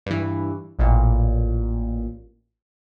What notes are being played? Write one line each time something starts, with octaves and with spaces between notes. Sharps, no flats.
G2 E3
A1 A#2